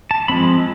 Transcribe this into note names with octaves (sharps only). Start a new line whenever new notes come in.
A5
F3 G#3 C4 B5